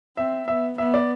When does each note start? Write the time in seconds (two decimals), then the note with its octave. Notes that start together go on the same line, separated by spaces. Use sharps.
0.17 C4 E5
0.48 B3 E5
0.78 B3 E5
0.94 D5